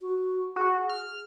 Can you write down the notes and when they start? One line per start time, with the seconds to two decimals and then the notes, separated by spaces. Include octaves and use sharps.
0.01 F#4
0.56 F#4 G#4
0.89 F6